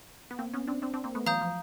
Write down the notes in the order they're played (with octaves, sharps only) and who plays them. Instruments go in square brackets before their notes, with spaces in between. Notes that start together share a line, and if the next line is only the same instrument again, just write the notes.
[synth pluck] B3
A#3 C4
B3 C#4
C4 D4
C4 D4
C4 D4
A#3 C4
A3 B3
[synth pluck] E3 F#3 [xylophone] F5 A#5 D#6 G6
[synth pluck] F3